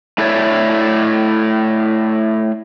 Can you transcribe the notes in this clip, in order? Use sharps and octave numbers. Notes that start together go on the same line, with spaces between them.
A3 E4 G4 A4 C#5 D5